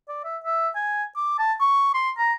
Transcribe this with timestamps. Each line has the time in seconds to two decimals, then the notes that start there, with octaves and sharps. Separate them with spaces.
0.08 D5
0.24 E5
0.44 E5
0.75 G#5
1.16 D6
1.39 A5
1.61 C#6
1.94 C6
2.18 A#5